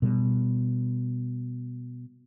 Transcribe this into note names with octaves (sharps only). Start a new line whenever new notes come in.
B2 G3